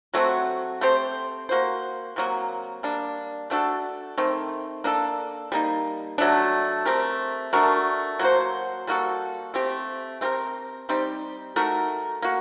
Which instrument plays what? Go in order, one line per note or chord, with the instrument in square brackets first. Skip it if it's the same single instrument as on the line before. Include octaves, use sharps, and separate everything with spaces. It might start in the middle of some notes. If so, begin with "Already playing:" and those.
[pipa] F#3 A3 C4 F#4
A3 C4 G4 C5
A#3 F#4 C5
C3 F#3 A#3
G3 A#3 D4
A3 D4 F#4 A4
D#3 A3 C4
A#3 D4 A4
G3 A#3 D#4
F#3 A3 D4
A3 C4 G4 A#4
A3 D4 F#4 A#4
F#3 A#3 F#4 C5
G3 A#3 F#4 A4
A3 C4 G4
A3 C4 G4 A#4
G3 C4 D#4 G4
A3 D#4 F#4 A#4
A#3 F#4